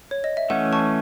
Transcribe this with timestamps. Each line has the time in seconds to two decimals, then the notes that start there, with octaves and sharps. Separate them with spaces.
0.11 C#5
0.24 D#5
0.37 E5
0.50 E3 A3 C#4 F#5
0.73 A5 C#6